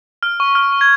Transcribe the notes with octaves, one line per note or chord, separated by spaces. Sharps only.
F6
C#6
F6
C#6
G#6